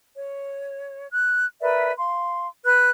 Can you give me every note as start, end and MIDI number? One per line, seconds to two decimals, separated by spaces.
0.16 1.08 73
1.11 1.45 90
1.61 1.91 70
1.61 1.91 71
1.61 1.91 74
1.61 1.91 76
1.96 2.47 77
1.96 2.47 84
2.64 2.89 71
2.64 2.89 90